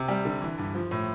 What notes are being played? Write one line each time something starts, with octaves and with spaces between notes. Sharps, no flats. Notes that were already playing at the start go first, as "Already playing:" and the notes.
Already playing: C3
G3
D3
E3
G2
F3
A2